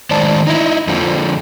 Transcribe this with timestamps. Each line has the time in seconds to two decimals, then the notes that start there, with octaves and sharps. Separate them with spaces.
0.10 A2 D#3 G#3 C5 D5 A5
0.47 D#4 E4
0.87 F2 D3 F3